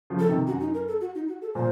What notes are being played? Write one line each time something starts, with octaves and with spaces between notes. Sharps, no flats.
C#3 F3
A4
C3 D#3
F#2 F#4
D#4
A#4
A4
F#4
D#4
F#4
A4
A#2 C5